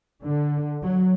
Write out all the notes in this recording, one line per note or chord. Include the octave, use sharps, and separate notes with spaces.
D3
F#3